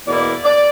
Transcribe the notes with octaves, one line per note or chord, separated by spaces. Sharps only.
E2 B2 A#3 E4 D5
D5